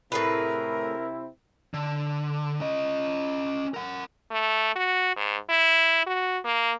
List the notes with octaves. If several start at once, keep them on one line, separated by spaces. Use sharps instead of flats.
A2 C3 C4 E4 G#4 A#4 B4
D3
C#4 D#5
A#4 F#5
A3
F#4
G#2
E4
F#4
A#3